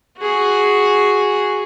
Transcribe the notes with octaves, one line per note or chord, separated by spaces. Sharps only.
F#4 G#4